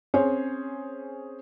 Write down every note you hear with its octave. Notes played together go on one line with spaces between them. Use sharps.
C4 C#4 G#4 C#5